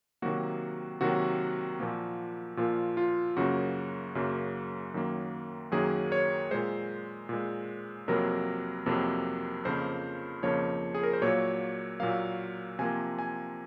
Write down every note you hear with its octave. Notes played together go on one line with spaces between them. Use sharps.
C3 D#3 F#3 A#3 F#4
C3 D#3 F#3 A#3 F#4
A#2 F3 A#3
A#2 F3 A#3 F4
F4
F#2 C#3 F#3 A#3 F#4
F#2 C#3 F#3 A#3
F#2 D#3 F#3 A#3
F#2 D#3 F#3 A#3 G#4
C#5
A#2 G#3 C5
A#2 G#3
F2 C3 F#3 A#3 A#4
F2 C3 F#3 A#3
F2 C#3 F3 A#3 C5
F2 C#3 F3 A#3 C#5
G#4
A#4
C5
A#2 F#3 A#3 C#5
A#2 F#3 A#3 F5
C3 F3 A#3 G#5
G#5